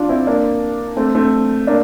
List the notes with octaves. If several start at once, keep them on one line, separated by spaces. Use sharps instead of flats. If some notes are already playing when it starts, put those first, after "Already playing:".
Already playing: D4 F4
C4 E4
A#3 D4
A3 C4
A3 C4
A#3 D4